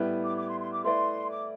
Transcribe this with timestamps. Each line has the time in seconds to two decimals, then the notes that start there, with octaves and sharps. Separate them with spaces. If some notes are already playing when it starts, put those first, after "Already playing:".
Already playing: A2 G3 B3 E4 B4
0.25 D6
0.37 D6
0.48 C6
0.60 C6
0.72 D6
0.84 A3 E4 B4 D5 C6
1.30 D6